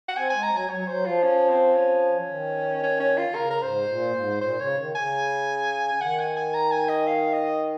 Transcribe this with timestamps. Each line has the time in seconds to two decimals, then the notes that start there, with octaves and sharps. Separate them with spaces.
0.08 F#5
0.16 C4 G#5
0.30 G#3 G#5
0.43 A#5
0.52 F#3 G#5
0.69 F#3 C#5
0.87 F#3 C5
1.06 F3 F4
1.23 C#4
1.49 C4
1.75 C#4
2.29 D#3
2.83 C#4
3.00 C#4
3.18 F4
3.35 C#3 A#4
3.50 A#4
3.61 G#2 C5
3.88 A#2
4.15 G#2
4.41 A#2 C5
4.59 C#3 C#5
4.77 D#3
4.95 C#3 G#5
6.01 D#3 F#5
6.19 G#5
6.36 G#5
6.54 A#5
6.71 G#5
6.89 D#5
7.07 F5
7.33 D#5